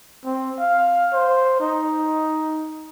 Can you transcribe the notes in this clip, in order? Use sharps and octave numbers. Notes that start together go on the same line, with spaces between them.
C4
F5
C5
D#4